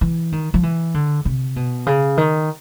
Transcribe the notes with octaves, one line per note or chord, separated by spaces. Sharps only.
E3
D#3
F3
E3
D3
C3
B2
C#3
D#3